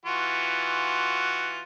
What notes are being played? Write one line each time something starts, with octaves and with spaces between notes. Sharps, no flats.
E3 F4 F#4